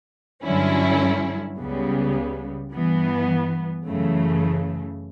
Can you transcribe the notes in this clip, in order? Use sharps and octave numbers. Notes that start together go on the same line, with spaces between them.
G2 D3 F#3 C#4 E4
C#2 C#3 G3 B3
G2 E3 B3
F#2 C#3 E3 A3